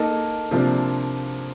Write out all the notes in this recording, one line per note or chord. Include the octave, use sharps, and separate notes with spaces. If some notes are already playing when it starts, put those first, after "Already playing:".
Already playing: A#3 D#4 A4
C3 F3 A#3 D4